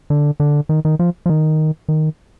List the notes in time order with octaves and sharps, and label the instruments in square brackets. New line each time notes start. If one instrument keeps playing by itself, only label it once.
[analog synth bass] D3
D3
D#3
D#3
F3
F3
D#3
D#3